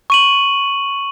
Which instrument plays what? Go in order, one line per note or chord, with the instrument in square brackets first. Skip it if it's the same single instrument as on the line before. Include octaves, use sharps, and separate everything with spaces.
[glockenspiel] C#6 D#7 F#7